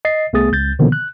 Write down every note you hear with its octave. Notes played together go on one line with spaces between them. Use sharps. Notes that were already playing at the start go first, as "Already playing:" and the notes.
D#5 A6 C7
C2 A3 B3 G#4 D#6 A6
C#2 G6 A6
B2 D3 D#3 F3 A#3 B3
F#6